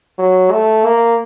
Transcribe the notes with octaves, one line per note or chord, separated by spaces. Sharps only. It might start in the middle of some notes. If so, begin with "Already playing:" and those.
F#3
A3
A#3